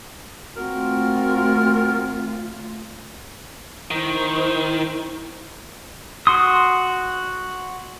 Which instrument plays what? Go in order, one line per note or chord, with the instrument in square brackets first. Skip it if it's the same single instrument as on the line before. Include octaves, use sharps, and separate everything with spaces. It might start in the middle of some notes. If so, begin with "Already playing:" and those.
[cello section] D#2 A3 F4 [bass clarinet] C4 [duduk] F#4 [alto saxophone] A#4
[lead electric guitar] D#3 [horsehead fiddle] E4 C5
[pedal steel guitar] F#4 C6 D#6